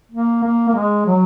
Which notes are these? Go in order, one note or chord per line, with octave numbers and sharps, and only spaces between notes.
A#3
A#3
A#3
G#3
F#3